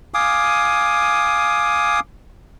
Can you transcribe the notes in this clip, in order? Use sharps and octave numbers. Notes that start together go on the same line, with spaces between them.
F5 G#5 D6 D#6